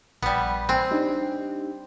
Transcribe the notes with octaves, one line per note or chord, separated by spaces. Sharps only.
A#1 G3 B3
C4 G#5 F#6
D4 D#4 G4